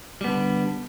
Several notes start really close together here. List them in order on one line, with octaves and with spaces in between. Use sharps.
G3 B3 D3